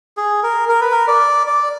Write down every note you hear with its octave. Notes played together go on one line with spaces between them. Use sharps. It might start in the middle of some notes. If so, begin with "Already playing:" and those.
G#4
A#4
A#4
B4
A#4
D5
D5